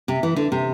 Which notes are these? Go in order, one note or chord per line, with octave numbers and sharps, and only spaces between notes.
C3
E3
D3
C3